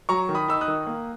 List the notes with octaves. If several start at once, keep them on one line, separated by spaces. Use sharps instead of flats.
F#3 A#5 C#6
D#3
B5 D#6
D#4 E6
D#6 F#6
D#3
A#3